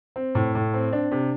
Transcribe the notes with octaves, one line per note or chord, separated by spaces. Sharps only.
C4
A2
A2
C4
D4
C3